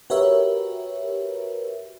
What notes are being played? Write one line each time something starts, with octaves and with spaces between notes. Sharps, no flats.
F#4 G4 A#4 B4 C#5 E5